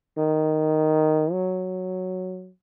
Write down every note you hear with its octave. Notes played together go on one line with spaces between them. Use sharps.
D#3
F#3